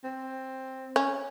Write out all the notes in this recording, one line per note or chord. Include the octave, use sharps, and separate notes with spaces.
C4
C#4